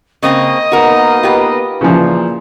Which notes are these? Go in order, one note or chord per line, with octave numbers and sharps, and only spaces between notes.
C#3 A#3 C4 D#5
A#3 B3 D#4 F#4 A#4
F4 G4 B4
A#2 C#3 E3 F3